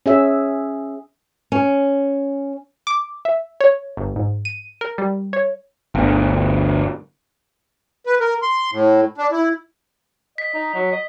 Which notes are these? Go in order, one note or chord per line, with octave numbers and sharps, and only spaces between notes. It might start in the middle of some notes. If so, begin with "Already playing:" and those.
C#4 G#4 E5
C#4
D6
E5
C#5
G1
G#2
D#7
A#4
G3
C#5
G1 D2
B4
A#4
C6
A2
D4
E4
D#5 B6
D#4
F#3
D#5